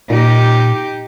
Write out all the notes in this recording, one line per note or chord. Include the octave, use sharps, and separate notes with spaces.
A#2 D#4 G4